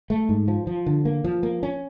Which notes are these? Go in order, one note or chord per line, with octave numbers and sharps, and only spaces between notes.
A3
G#2
F3
F3
D3
A#3
F3
A#3
C#4